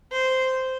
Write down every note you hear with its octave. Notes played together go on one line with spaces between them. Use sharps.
C5